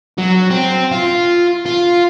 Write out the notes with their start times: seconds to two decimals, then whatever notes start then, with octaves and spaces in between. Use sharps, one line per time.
0.18 F#3
0.51 C4
0.92 F4
1.66 F4